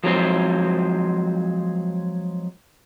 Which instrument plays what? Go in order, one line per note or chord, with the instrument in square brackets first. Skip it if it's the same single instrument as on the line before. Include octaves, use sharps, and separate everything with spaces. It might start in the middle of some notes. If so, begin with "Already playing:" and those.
[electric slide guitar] F3 F#3 G#3 C4 C5